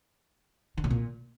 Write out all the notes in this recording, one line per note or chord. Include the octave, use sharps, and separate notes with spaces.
D3
A2
A#2